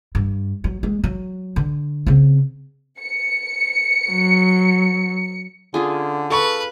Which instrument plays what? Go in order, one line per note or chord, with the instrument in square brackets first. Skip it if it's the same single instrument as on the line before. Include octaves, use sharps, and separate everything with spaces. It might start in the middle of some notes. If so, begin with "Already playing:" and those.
[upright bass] G2
F#3
G#3
F#3
D3
C#3 C4
[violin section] C#7
[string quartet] F#3
[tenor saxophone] D3 [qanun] C#4 F4 G#4
[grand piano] A4 C#6 [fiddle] B4 [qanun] F5